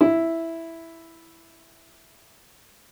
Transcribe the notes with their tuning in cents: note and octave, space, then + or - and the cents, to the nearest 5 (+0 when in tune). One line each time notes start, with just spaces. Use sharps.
E4 +0